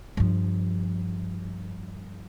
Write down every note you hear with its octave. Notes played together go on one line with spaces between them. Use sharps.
G2 F3